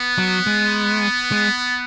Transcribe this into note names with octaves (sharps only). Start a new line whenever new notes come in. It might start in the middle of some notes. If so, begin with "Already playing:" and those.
Already playing: B3
F#3
G#3
G#3